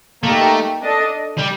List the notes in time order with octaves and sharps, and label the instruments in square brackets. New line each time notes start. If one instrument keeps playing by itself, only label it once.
[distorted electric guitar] A3 [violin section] A#3 D#4 G4 A#4
[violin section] D4 A4 D#5
[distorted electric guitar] G3